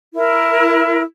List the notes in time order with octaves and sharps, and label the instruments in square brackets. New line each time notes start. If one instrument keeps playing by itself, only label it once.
[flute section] E4 A#4